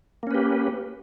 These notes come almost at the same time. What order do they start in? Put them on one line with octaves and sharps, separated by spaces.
A#3 C#4 B4 G4